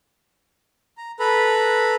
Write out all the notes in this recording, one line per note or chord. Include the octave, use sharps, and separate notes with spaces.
A#5
A4 B4 A#5 B5